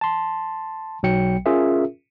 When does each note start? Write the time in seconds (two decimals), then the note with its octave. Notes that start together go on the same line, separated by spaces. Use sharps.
0.01 A5 C6
1.03 B1 F#3 G5 C#7
1.46 C#4 F4 G#4 A#4 E5